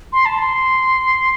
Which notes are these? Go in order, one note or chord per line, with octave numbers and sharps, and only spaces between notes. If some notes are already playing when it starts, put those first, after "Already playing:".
C6
A5
C6